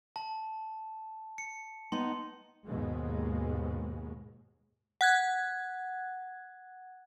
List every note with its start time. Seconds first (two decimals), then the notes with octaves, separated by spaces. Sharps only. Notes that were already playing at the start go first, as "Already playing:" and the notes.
0.16 A5
1.38 C#7
1.92 B3 D#4 C6
2.66 D#2 G#2 B2 G#3
5.01 F#5 F#6 G#6